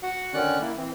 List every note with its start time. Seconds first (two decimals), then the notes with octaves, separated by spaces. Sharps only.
0.03 F#4 F#5
0.34 D3 D#3 C#4 D5 F#6
0.61 A#3 E4
0.77 E3 C4